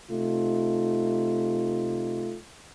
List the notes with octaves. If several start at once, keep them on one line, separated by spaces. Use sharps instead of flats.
C3 A3 D#4 F4